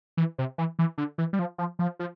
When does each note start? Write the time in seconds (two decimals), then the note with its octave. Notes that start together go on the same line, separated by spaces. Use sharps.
0.17 E3
0.38 C3
0.58 E3
0.79 E3
0.98 D3
1.18 E3
1.33 G3
1.39 F3
1.58 F3
1.79 F3
1.99 F3